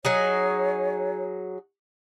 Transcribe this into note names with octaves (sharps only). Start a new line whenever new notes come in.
F#3 D#4 G#4 C#5